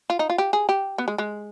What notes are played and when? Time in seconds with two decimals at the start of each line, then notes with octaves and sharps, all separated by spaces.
0.10 F4
0.19 D#4
0.30 F4
0.38 G4
0.53 G#4
0.69 G4
0.98 B3
1.08 G#3
1.18 G#3